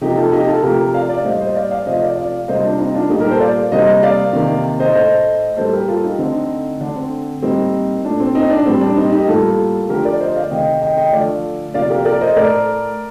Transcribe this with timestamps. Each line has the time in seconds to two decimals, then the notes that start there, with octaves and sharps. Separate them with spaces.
0.01 C3 F3 A#3 D#4 G4
0.17 F4 A4
0.32 D#4 G4
0.47 F4 A4
0.63 C3 F3 A3 G4 A#4
0.94 D5 F5
1.09 D5 F5
1.24 A2 G3 A#3 C5 D#5
1.40 C5 D#5
1.55 D5 F5
1.71 D5 F5
1.86 C3 F3 A3 C5 D#5
2.01 D5 F5
2.17 D5 F5
2.48 C3 G3 A#3 C5 D#5
2.64 D4 F4
2.79 C4 D#4
2.94 D4 F4
3.10 A#2 G3 A#3 D#4 G4
3.20 G4 A#4
3.31 A4 C5
3.40 D5 F5
3.72 C3 G3 A#3 C5 D#5
4.03 D5 F5
4.33 C3 D#3 A#3
4.80 C5 D#5
4.95 A2 A3 C5 D#5
5.57 A2 G3 A#3 A4 C5
5.73 G4 A#4
5.88 F4 A4
6.04 D#4 G4
6.19 D3 A3 C4 D#4
6.80 D3 A3 D4
6.96 C4
7.42 A2 G3 A#3 C4 D#4
8.04 A#2 A3 D4
8.20 C4
8.35 C4 D#4
8.51 D4
8.66 A2 G3 A#3 C4
8.81 D4
8.96 C4 D#4
9.12 D#4 G4
9.28 A2 G3 A#3 F4 A4
9.89 D3 F3 A3 G4 A#4
10.04 A#4 D5
10.20 C5 D#5
10.36 D5 F5
10.51 C3 D#3 A3 D#5 G5
10.82 D#5 G5
10.97 D#5 G5
11.13 D3 F3 A3 D5 F5
11.74 C3 F3 A#3 D5 F5
11.90 G4 A#4
12.05 A#4 D5
12.21 C5 D#5
12.36 A2 A3 A#4 D5